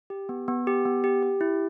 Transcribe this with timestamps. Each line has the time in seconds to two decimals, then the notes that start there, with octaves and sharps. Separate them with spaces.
0.10 G4
0.29 B3
0.48 B3
0.67 G4
0.86 B3
1.04 G4
1.23 G4
1.41 E4